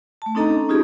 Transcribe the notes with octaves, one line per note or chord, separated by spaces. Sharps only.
A3 A5
C4 D4 D#4 A4 D#5 A#5
C#4
C#4 D#4 F4 G4 G#4